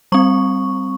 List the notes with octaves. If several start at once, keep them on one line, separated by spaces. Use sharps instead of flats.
G3 C4 C#6